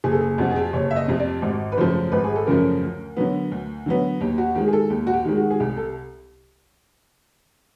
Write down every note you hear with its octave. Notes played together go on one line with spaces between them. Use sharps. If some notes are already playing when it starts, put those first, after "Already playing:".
F#1 G#4
A4
G#4
F2 C3 F#4
G#4
G4
F#1 C#5
E5
D#5
F2 C3
D5
G#1
B4
F#2 C#3 F3 A3 C5
G#1 B4
G#4
A4
F#2 C#3 F3 A3 A#4
D2
D3 F#3 B3
D2
D3 F#3 B3
D#2 G4
F#4
D#3 G#3 G4
G#4
A4
D#2 G4
F#4
G4
D#3 G#3
F#4
G#4
C2 G4
A4